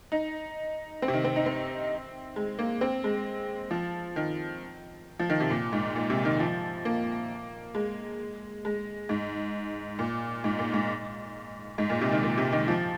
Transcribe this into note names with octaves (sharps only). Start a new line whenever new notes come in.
D#4
C4
C3
D#3
C4
D#4
C4
G#3
A#3
C4
G#3
F3
D#3
F3
D#3
C3
A#2
G#2
A#2
C3
D#3
F3
A#3
G#3
G#3
G#2
A#2
G#2
A#2
G#2
G#2
A#2
C3
D#3
A#2
C3
D#3
F3